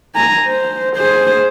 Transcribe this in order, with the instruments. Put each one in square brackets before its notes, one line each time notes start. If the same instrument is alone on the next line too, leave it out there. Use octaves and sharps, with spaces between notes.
[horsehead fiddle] G#5 A#5
C5
G#4 C5